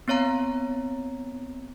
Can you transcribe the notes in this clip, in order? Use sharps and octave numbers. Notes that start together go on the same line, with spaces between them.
B3 C4 C#5 F5 A#5